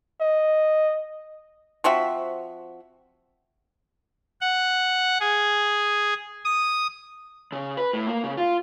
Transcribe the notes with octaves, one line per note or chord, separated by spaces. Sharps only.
D#5
F3 C4 F#4 E5
F#5
G#4
D#6
C#3
B4
A2
A#3
C#3
F4